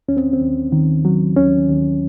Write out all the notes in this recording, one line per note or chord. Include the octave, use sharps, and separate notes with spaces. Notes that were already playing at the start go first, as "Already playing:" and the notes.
D#2 C#4
C4
C4
D#2
D#3
F#3
D#2 C#4
D#2